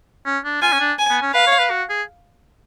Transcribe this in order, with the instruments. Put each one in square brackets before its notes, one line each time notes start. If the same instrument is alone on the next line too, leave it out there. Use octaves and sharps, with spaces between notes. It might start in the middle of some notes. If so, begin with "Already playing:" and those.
[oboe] C#4
D4
[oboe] F4 [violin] G#5
[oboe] C#4
D4
[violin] G#5
[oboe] B3
C#4
[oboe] B4 [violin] F5
[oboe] C#5
B4
F#4
G#4